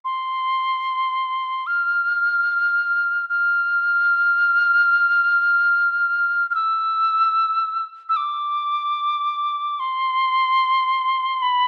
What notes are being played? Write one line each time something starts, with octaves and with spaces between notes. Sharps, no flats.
C6
F6
F6
F6
E6
E6
D6
C6
B5